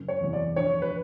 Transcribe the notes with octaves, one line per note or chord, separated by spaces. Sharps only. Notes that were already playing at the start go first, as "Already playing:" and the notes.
Already playing: F#1
C#5
E2 C3
D5
A#1 C#5
B4